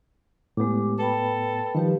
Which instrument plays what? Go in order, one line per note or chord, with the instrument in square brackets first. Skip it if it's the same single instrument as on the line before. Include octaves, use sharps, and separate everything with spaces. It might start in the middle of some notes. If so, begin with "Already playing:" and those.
[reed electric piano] A2 B3 [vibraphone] G#3 G4 D6
[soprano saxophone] A4 [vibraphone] B4 G5 B5
[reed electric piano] D#3 F3 G3 [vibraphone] G4 B4 F5